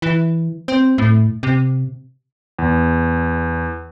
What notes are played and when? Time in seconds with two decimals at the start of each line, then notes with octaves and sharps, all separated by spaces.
0.02 E3
0.68 C4
0.98 A2
1.43 C3
2.59 E2